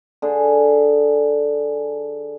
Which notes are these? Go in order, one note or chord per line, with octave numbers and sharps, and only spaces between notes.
D3 G#4